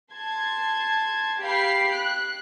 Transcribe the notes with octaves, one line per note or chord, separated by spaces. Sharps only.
A5 C6 G#6
G4 F5 G5 B5 C7
F#6